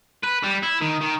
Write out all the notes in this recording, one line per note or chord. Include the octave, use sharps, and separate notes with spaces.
B4
G3
E4
D#3
D#3